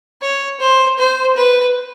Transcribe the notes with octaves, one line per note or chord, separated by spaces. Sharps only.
C#5
C5
C5
B4